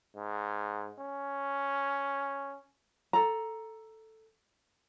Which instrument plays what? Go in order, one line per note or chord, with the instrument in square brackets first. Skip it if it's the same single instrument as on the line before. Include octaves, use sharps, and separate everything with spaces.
[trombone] G#2
C#4
[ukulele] A4 A#5